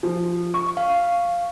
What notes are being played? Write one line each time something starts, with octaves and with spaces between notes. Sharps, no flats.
F3
C#6
F5